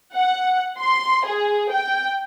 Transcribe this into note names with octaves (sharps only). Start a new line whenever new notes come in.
F#5
C6
G#4
G5